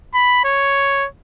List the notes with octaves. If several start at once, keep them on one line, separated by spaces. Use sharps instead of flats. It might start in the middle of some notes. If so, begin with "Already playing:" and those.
B5
C#5